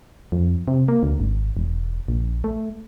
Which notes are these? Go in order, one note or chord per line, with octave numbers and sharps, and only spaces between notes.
F2
C3
A#3
D2
G#1
E1
A#1
A3